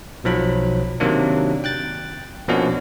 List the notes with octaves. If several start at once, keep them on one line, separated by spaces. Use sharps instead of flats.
B1 F3 F#3 B5
C3 D#3 F#3 A#3 D4
G5 F#6 A6
B2 F3 A#3 C#4 D4 F#4